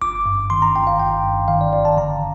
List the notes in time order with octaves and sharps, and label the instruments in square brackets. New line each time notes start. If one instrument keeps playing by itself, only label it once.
[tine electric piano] G1 D6
G2
D#3 C6
A#5
G1 G5
F5
G1 G5
G2
D#3 F5
D5
G1 D5
A5
D3 A#5